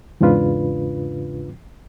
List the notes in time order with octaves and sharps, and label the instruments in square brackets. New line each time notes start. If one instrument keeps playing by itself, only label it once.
[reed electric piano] E2 G#2 C#3 D4 F4 B4